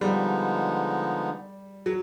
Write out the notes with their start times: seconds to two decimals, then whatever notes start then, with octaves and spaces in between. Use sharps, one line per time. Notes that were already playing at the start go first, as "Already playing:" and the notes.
0.01 D3 F3 G3 G#3 B3 D#4
1.86 F#3